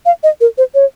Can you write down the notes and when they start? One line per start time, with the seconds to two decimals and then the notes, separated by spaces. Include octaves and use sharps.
0.06 F5
0.23 D#5
0.41 A#4
0.58 C5
0.75 C#5